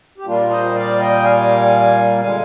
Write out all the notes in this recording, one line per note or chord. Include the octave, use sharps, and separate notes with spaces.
G4
A#2 G3 A#3 D4 F4
C5 D#5
D5 F5
D#5 G5
F5 G#5
D3 G#3 F5 G#5